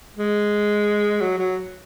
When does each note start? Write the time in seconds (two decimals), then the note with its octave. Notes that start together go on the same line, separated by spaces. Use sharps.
0.17 G#3
1.21 F#3
1.38 F#3